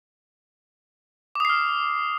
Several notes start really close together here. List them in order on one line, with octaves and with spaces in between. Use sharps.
D6 D#6 C7 F6